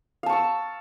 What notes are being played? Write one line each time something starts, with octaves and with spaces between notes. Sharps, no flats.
F5 A5 C#6 E6